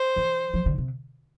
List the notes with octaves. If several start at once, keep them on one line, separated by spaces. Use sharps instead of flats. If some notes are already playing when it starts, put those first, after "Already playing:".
Already playing: C5
E3
F3
D3
C3